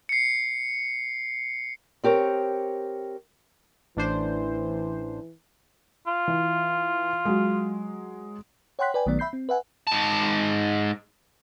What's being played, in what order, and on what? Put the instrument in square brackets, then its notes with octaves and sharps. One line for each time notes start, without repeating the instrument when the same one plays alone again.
[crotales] C7 C#7
[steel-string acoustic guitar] C4 G4 A#4 C#5
[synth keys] A1 D4 C5 [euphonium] E3
[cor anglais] F4
[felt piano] E3
F#3 G#3
[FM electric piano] C#5 F#5 G5 C6 F#6 B6
B4 D5 G5 G#5
A#1 D#3 F#3 A3 B3 D5
E5 B5 G6 C7
C4
B4 E5 F#5 G#5
[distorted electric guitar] G#2 A5